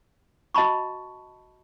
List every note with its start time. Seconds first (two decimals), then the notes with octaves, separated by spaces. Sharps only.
0.54 F#4 D#5 A5 B5 C#6